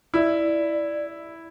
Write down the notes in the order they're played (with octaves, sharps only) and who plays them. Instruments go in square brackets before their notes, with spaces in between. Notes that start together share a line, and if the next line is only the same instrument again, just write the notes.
[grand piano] E4 [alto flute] D5